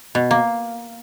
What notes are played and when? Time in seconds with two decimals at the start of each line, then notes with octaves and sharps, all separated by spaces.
0.15 B2
0.31 A#3